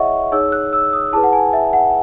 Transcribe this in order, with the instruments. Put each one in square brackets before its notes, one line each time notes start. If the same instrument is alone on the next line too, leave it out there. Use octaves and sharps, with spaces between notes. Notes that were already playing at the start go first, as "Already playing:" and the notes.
Already playing: [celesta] E4 G#4 C#5 D#5 E5 F#5 C#6
D#4 G#4 C#5 E6
F#6
E6
D#6
E4 G#4 B4 A5
F#5
G#5
E5
F#5